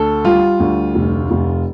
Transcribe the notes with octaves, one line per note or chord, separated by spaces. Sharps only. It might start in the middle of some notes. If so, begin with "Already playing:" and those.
Already playing: D2 A4
G3 F4
D2
F1
F1